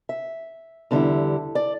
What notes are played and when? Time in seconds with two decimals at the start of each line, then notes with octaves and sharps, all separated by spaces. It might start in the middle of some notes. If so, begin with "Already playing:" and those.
0.09 E5
0.91 E2 D3 G3 E4
1.55 D5